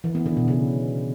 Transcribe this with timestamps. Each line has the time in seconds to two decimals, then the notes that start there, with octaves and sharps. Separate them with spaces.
0.04 E3
0.15 B3
0.26 D3
0.37 B2
0.48 C#3